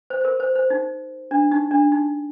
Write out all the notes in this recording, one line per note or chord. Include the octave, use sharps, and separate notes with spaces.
C5
C5
A#4
C5
C5
D#4
D4
D#4
D4
D#4